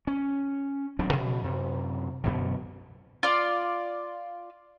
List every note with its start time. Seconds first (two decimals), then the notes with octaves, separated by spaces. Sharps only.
0.07 C#4
0.99 D#1 F#3 C4 D4
1.13 A#2 C#3 F3
1.44 F#2 C3
2.24 F#2 B2 D3
3.23 F4 D5